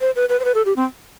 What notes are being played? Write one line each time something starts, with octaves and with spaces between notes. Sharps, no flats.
C5
B4
B4
C5
B4
A4
G4
C4